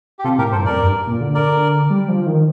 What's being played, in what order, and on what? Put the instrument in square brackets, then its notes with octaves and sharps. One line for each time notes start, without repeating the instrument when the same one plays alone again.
[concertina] G4
[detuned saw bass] C3 [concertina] F4 A4
[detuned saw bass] A2 [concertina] G4 A#4
[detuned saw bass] G2 [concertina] A4 C5
[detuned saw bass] F2 [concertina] A#4 D5
[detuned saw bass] G2
A#2
D3
[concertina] A#4 D5
[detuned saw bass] G3
F3
D#3